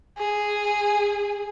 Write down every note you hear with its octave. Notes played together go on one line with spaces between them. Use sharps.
G#4